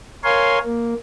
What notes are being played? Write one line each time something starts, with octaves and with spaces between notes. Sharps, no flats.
A#4 C#5 F5 G#5 C6
A#3